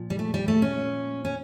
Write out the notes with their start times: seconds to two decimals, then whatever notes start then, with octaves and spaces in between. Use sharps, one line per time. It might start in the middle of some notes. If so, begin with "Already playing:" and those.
Already playing: A#2 F3
0.10 G3
0.19 A3
0.34 G3
0.48 A3
0.62 C#4
1.25 C#4